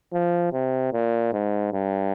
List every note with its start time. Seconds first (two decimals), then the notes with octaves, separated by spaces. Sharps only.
0.13 F3
0.53 C3
0.93 A#2
1.33 G#2
1.73 G2